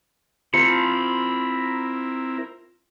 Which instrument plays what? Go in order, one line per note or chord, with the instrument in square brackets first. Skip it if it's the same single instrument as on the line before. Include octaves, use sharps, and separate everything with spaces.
[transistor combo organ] C4 E4 A#4 [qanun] F4 C5 [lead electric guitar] A#5 B5 [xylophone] C#7